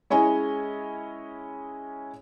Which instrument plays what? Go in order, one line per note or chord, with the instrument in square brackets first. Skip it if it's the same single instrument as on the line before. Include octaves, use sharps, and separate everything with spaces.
[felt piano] G#3 C#4 E4 C#5 D#5 G#5